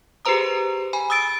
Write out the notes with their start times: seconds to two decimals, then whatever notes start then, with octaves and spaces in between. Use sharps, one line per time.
0.25 G4 G#4 B4 C5 A#5 D#6
0.93 G#5 B5
1.10 D#6 E6 A6 D7